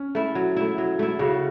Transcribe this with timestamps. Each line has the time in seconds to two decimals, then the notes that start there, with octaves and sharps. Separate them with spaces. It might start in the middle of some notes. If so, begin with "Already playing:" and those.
Already playing: C#4
0.15 A3 E4
0.35 F#3
0.57 A3 E4
0.78 F#3
0.99 A3 E4
1.19 C#3 F#4